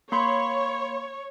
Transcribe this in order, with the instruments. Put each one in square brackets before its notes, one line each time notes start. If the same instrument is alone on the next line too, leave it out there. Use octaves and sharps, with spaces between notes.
[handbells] A#3 B5 C6 [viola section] C#5